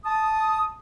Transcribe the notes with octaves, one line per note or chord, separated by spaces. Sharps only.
A5 D#6